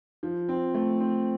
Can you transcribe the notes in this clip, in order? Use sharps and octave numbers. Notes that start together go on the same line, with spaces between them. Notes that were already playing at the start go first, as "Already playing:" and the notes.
F3
C4
A3
C4